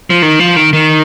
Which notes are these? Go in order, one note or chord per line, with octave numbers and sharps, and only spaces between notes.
F3
D#3
F3
D#3
D#3